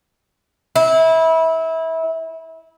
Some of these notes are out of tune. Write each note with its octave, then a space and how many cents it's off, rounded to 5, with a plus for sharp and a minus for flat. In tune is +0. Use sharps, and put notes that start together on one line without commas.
E4 -25